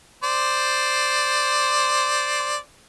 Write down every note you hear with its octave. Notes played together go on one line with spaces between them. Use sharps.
C5 D5